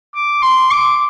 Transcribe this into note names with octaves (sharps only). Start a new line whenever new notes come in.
D6
C6
D6